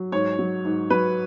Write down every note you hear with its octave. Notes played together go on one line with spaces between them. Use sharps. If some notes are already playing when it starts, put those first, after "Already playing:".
Already playing: F#3
G#2 C#5
F#3
G#2
F#3 B4